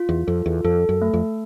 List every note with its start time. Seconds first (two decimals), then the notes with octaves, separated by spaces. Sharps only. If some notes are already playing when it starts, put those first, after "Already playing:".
Already playing: F4
0.09 E2
0.27 F2 A4
0.46 E2
0.64 F2 A4
0.89 F#2
1.02 A3
1.14 F2